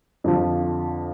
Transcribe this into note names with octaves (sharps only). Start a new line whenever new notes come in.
F2 D3 F3